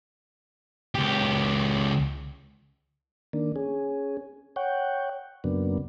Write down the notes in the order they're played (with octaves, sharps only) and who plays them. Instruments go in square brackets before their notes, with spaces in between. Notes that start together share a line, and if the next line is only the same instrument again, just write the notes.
[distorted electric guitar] C#2 G4
[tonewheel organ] D#3 A#3 D4
C#4 G#4
C#5 F#5 G5
F#2 C#3 F#3 A#3 B3 D4